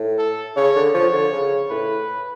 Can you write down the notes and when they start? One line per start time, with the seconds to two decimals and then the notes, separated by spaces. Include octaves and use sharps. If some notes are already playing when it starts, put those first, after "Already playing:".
Already playing: A2
0.18 A4
0.57 C#3 C#5
0.76 D3
0.94 F3 C#5
1.13 D3
1.32 C#3
1.70 A2 B4